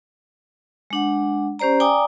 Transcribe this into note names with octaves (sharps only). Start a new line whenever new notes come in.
G#3 D4 F#5
C#4 G4 C5 D5 A#5
D5 G5 G#5 A#5 D6 D#6